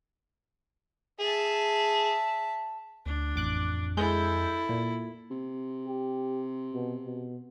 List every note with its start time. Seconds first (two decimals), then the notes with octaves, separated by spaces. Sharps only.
1.20 G#4 E5 A5
3.06 D2 D4
3.36 A1 F2 D6 F#6
3.97 G#3 E4 A4 G6
4.69 A#2
5.31 C3
5.87 G4
6.74 B2
7.06 B2